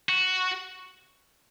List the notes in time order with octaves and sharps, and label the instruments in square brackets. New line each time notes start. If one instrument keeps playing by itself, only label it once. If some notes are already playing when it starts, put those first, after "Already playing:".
[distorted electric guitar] F#4